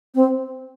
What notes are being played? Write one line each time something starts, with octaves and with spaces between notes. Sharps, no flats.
C4